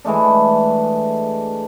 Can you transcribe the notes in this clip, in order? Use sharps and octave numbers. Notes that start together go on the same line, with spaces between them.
E3 G#3 A3 D4